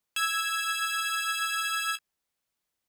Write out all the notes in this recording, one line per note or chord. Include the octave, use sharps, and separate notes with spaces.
E6 G#6